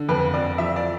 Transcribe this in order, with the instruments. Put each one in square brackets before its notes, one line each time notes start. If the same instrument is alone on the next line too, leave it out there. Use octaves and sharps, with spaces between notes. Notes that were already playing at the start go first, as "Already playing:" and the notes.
Already playing: [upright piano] D3
F2 B4
F2 D5
F3 E5
D5